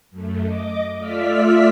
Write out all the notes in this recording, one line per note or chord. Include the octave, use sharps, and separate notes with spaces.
F#2 A3
D#5 D6
A3 F4 D5 E5 F6 B6